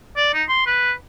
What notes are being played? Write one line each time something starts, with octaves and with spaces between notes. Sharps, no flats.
D5
D#4
C6
B4